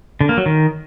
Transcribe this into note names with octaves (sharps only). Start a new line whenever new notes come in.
D3
A#3
F#3
D#3